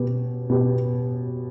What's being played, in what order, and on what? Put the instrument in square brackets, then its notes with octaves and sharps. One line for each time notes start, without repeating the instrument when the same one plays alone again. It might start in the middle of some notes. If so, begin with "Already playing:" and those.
Already playing: [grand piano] B2 B3 G4
B2 B3 G4